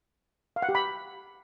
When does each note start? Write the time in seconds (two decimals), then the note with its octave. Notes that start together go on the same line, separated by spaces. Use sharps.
0.56 F5
0.62 F#5
0.69 G4
0.75 B5